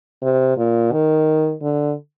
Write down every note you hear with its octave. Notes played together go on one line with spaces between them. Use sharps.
C3
A#2
D#3
D3